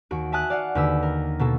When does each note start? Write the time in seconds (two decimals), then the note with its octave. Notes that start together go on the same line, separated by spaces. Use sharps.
0.11 D#2 F#4 D7
0.32 E5 G#5 A5 D#6 F#6
0.50 D5 F5 F#5
0.75 D#2 D3 B4 E6
1.03 A#4
1.39 B2 A#3 A4